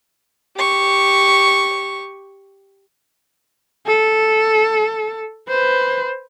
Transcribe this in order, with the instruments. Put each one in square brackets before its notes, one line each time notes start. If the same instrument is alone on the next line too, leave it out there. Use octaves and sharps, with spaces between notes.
[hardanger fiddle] G4 C#6
[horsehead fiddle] A4
B4 C5